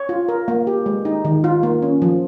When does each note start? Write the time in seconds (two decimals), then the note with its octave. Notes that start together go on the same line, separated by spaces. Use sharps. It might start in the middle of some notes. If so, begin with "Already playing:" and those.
Already playing: C#5
0.09 F4
0.29 A#4
0.48 A#3
0.67 G4
0.86 G#3
1.05 D#4
1.25 D#3
1.44 F4
1.63 A#3
1.82 C#4
2.02 F3